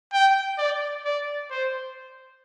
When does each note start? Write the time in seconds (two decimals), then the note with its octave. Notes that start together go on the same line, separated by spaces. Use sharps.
0.13 G5
0.58 D5
1.05 D5
1.50 C5